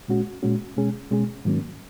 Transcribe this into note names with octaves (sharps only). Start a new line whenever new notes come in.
A#2 G#3 C#4 F#4
A#2 G#3 C#4 F#4
B2 G#3 C#4 G#4
B2 G#3 C#4 G#4
G#2 D#3 F#3 A#3 C#4